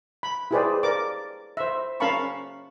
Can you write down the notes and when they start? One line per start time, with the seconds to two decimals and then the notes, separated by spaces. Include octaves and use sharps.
0.23 B5
0.51 E4 G4 G#4 B4 C5 D5
0.83 A#4 D5 D6
1.57 C5 E5
2.00 C#4 A#4 F5 A5 B5 C#6